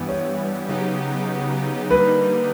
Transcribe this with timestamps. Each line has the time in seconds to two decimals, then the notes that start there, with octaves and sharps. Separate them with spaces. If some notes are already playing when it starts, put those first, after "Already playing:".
Already playing: G2 E3 G3 B3
0.09 C#5
0.69 C#3 F#3 B3 D#4 G4
1.90 D3 G3 A#3 D#4 B4